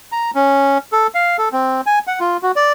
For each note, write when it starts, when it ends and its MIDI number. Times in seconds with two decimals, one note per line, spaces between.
0.12 0.31 82
0.35 0.78 61
0.92 1.07 69
1.15 1.37 77
1.38 1.49 69
1.53 1.81 60
1.86 1.99 80
2.07 2.19 78
2.20 2.37 65
2.43 2.52 66
2.56 2.73 74